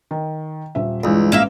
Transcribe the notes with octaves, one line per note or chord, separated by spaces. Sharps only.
D#3
D#1 E5
C#2 G2 E3
A1 A#3 E5 F5